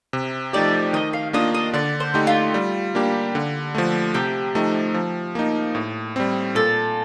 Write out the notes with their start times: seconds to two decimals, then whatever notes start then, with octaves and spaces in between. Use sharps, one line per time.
0.13 C3
0.53 F3 A3 D#4 G4 D5
0.93 D#3 D#5
1.13 F5
1.33 A#3 D4 F4 D#5
1.54 D#5
1.74 D3 D5
2.00 C5
2.14 A3 D#4 G4
2.27 F4
2.54 G3
2.95 A#3 D4 G4
3.35 D3
3.75 F3 A3
4.14 C3 G4
4.55 F3 A3 D#4
4.94 F3
5.35 A#3 D#4
5.75 A2
6.16 G3 C4
6.55 A#2 A4